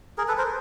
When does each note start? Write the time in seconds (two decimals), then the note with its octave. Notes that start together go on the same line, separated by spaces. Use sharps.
0.18 G#4 A#4
0.28 A4 B4
0.38 A#4 C5